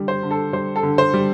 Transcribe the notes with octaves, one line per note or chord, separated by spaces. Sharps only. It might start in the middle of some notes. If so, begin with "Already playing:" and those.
Already playing: D3 G3
C5
D3
A4
G3 C5
A4
D3
C5
G3